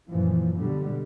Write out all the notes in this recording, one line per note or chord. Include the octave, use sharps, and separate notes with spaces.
F#2 A#2 E3 F3
B2 D3 G3